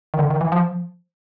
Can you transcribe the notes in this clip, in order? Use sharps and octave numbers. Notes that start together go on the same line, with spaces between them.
D#3
D3
D#3
E3
F3